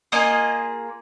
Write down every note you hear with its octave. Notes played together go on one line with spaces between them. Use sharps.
A#3 F4 G#4 D#5 D#6